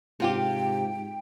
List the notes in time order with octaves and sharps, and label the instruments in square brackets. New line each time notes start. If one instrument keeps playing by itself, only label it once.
[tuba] G#2 [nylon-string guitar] C3 F4 G4 [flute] G5